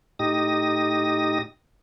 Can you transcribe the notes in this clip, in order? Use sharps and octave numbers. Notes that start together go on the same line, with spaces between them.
A2 D#4 G4 D#6 A#6